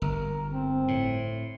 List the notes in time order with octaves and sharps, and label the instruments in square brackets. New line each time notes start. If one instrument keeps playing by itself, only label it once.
[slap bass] G1 [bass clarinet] A#4
[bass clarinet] C4
[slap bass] A2